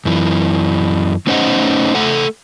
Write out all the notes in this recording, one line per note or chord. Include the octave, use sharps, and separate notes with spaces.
F#2 E3
A3 C#4 D#4 C5 D#5 F#5
A3 A4 F#5